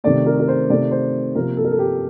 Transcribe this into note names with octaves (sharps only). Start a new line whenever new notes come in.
C3 D#3 A3 D5
A#4
A#4
C5
C3 D#3 A3 D5
C5
C3 F3 A#3 A#4
A4
A#4
A4
G4